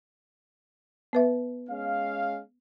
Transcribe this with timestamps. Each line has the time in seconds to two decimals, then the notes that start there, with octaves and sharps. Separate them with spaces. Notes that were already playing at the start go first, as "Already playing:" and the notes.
1.13 B3 B4 E5
1.69 G#3 C#4 F5